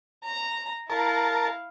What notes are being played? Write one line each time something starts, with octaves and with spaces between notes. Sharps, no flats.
A#5
E4 A#4 F5 A5